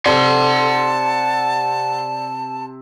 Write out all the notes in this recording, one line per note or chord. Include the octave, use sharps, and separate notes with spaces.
C3 C4 D5 F#5 A5 C6